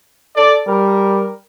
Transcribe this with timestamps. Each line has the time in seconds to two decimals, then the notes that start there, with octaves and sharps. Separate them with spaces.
0.36 A4 D5
0.68 G3 A#4